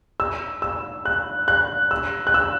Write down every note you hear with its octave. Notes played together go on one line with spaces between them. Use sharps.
E6
E6
F#6
F#6
E6
F#6
E6